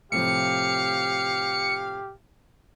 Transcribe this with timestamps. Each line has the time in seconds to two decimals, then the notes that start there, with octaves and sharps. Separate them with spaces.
0.12 A2 C3 F3 G4 F5 C#7